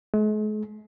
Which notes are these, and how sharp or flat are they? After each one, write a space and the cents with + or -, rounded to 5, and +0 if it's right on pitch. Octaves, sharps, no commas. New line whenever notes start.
G#3 +45